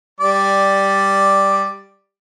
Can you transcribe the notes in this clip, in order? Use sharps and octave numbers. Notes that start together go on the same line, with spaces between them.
G3 D5